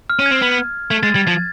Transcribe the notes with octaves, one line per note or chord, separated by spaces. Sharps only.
F6
C#4
C4 G#6
B3
A3 G#6
G#3 A6
G3 G#6
F3 G#6